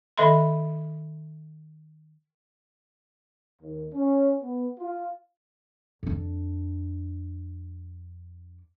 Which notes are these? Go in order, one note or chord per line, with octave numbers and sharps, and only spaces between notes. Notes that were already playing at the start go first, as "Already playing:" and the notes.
D#3 A4 D#5 E5 B5 C6
D#2
C#4
B3
F4
F2 D4